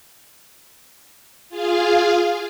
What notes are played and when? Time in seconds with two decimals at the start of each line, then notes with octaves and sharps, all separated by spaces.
1.49 F4 G#4 F5